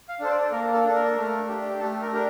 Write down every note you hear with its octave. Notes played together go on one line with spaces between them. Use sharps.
F5
D4 A4 C5
D5
A#3 A#4
A4
D4 A4
A#4
A3
D4 G4
A3 A4
A#4
D4 G4 A#4